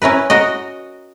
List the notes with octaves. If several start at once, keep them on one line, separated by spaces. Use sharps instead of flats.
C#4 E4 A#4 B4
F#4 A#4 D#5